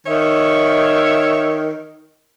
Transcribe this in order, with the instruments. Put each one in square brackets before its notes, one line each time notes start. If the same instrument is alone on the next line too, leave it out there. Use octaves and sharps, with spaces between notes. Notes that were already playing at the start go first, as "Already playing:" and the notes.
[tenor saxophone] D#3 [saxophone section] C#5 E5